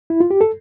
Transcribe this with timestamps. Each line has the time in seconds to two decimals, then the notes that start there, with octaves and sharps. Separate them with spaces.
0.10 E4
0.20 F4
0.30 G4
0.41 A4